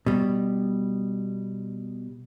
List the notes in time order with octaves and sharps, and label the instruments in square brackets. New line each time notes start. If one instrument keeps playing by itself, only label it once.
[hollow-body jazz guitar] B2 G3